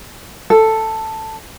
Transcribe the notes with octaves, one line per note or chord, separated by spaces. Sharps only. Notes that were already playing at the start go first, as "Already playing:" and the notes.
A4